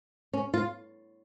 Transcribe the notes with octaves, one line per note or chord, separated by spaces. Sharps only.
C#4
F4